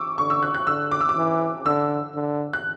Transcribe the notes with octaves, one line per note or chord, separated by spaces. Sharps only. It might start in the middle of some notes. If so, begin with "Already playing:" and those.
Already playing: C#6 D6 E6
D3 C#6
E6
F#6
F#6
D3 E6
D6
E6
D6
E3
D3 E6
D3
F#6